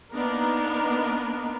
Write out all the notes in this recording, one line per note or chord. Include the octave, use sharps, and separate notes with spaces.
A#3 B3 D4 D#4 A#4